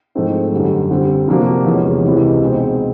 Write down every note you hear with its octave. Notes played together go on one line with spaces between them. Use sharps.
G#2 F3 A3 C4 D#4
F#2 D3 G3
D3 G3 C4
C3 F3 A#3 D4 F#4
E2 C3 F3 G#3 C#4
C#2 C3 E3
B2 G#3 C4 D#4